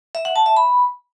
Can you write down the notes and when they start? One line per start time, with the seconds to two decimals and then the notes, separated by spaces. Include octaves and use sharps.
0.15 E5
0.25 F#5
0.36 A5
0.46 E5
0.57 B5